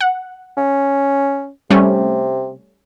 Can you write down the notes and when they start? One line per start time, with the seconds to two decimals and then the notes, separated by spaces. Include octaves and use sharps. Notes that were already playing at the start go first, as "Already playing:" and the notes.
0.01 F#5
0.57 C#4
1.70 C3 G3 A3 C#4